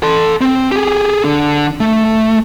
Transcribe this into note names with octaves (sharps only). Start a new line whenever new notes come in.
A4 C6
C4
G4 G#4
D3
A3